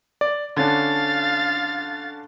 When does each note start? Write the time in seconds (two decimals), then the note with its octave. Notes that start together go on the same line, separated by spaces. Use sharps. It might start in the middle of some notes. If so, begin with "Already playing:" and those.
0.21 D5
0.57 D3 C#4 D4 F5 A6